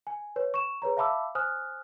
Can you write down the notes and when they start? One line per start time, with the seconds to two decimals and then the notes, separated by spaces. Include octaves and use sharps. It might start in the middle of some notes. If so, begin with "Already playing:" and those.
0.07 G#5
0.36 B4 C#5
0.54 C#6 E7
0.82 G#4 B4 C#5 A#5
0.97 E5 F5 A5 B5 D6 E6
1.35 C5 G#5 D#6 F6 F#6